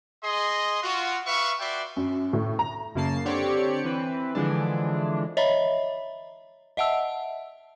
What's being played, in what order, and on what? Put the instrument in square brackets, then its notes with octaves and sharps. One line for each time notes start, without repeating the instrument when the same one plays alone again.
[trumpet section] G#4 D#5 C6
F4 F#4
B4 E5 F5 C#6
F#4 B4 D5 E5 G5 C6
[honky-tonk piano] F#2
A2
A#5
[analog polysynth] F#2 C#3 A#3 A5 C7
D3 C4 G4 C#5 D5 C#7
E3 C4 B4
D3 E3 F3 G#3 D4
[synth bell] C#5 D#5 E5 A#5 B5
D#5 E5 F#5 A5 E6